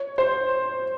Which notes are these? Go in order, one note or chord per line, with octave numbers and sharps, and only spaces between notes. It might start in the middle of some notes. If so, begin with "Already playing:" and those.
Already playing: C#5
C5